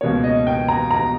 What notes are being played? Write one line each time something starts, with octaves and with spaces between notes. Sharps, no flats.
C#2 B2 A#3 C#5
D#5
G5
A#5
A#5